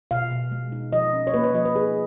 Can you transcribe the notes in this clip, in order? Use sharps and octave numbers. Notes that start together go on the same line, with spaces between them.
B2 F5
B2
G#3
D#4
F3 D#5
C#4
C#5
A#3 B4
C#5
F3 D#5
B4
D#4 G#4